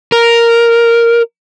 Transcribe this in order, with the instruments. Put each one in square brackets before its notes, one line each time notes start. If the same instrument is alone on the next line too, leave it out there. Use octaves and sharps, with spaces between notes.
[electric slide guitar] A#4